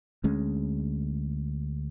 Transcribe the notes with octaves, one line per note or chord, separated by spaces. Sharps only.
D2 G#3 C#4